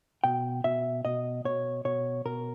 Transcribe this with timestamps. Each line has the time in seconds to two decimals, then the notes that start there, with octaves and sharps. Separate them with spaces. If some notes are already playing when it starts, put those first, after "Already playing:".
0.24 B2 G5
0.64 B2 E5
1.05 B2 D#5
1.45 B2 C#5
1.85 B2 C#5
2.25 B2 A#4